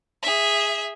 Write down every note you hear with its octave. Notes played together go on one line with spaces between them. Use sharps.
G#4 E5